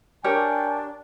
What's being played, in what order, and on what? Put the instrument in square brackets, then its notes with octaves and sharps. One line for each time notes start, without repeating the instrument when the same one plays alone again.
[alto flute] D4 [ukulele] G4 A#4 C#5 [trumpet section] G5 G#5